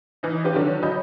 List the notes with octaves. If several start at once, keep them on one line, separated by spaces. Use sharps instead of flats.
E3 D#4
C#4 F4 G4 B4
D3 D#3 F#3
F#3 D#5 B5 G6